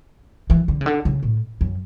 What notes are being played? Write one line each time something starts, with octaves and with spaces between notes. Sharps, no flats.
E3
D3
C#3
D3
C#3
A2
F#2